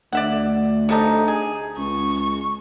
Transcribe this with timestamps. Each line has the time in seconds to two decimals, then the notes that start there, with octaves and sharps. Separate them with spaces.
0.12 D2 D5 E5 F#5
0.89 C3 A3 D#4
1.28 G#4
1.78 C#2 C#6